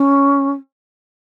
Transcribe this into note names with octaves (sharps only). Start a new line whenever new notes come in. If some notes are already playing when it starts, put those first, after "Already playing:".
Already playing: C#4